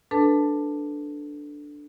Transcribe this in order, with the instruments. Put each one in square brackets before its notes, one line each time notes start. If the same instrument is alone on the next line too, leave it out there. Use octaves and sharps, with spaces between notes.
[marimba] D4 A4 B4 A5